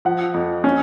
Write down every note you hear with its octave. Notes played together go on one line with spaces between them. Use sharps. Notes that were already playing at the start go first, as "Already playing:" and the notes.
F3 F#5
F2
C#4